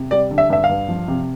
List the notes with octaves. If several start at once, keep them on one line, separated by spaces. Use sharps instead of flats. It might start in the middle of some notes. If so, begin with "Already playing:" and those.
Already playing: C3
G3 D5
D3
E5
G2 E5
F5
G2
F3
C3